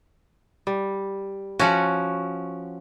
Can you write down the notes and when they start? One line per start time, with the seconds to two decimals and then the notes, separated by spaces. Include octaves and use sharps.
0.67 G3
1.59 F3 C#4 F#4 F#5